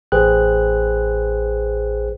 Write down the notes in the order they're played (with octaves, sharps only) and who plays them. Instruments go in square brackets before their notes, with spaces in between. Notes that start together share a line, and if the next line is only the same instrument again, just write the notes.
[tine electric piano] A1 G#4 B4 C5 G5 F#6